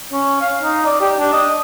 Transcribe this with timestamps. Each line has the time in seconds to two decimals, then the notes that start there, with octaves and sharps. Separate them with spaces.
0.12 C#4
0.41 F5
0.63 D#4
0.86 D5
1.01 G4
1.19 D4
1.33 D#5